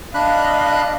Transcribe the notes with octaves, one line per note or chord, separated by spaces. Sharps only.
D4 D#5 F5 B5 F#6